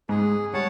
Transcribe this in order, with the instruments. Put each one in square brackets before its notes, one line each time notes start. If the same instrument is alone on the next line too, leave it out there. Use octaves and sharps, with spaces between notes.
[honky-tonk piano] G#2 G#3 [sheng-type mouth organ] G#4
[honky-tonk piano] G3 [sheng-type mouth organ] C#5 F#5 A5